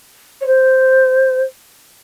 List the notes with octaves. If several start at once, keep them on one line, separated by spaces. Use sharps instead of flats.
C#5
C5